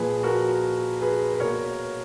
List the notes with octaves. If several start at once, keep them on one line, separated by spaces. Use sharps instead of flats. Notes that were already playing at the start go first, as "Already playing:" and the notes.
Already playing: A#2 F3 A#3 G#4 B4
F#4 A#4
G#4 B4
B4
B2 A#3 A#4 C#5